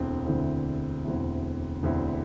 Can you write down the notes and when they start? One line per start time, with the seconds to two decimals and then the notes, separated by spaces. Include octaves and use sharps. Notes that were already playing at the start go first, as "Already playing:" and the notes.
Already playing: E1 D2 D3 C4 E4
0.26 E1 D2 D3 C4 E4
1.04 E1 D2 D3 C4 E4
1.83 E1 D2 D3 C4 E4